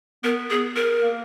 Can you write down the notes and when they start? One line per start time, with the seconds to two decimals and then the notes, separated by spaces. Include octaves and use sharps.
0.24 B3 A#4
0.50 G#4
0.76 A#4
1.02 A#3